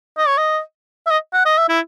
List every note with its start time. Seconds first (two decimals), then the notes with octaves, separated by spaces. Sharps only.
0.17 D#5
0.27 C#5
0.37 D#5
1.07 E5
1.11 D#5
1.34 F#5
1.45 D#5
1.58 E5
1.69 E4